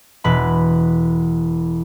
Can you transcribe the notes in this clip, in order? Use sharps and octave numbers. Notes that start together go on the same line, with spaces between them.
E1 B4 B5